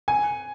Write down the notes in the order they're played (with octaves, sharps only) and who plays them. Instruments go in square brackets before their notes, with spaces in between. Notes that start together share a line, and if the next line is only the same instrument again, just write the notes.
[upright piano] G#5